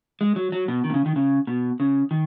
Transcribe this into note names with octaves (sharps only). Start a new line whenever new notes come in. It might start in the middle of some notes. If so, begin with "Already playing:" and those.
G#3
F#3
F#3
B2
D#3
B2
C#3
D#3
C#3
B2
C#3
D#3